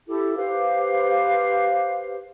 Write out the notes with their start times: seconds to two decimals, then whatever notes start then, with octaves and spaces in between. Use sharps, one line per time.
0.07 E4 G4 A4
0.36 G4 B4 C5 F5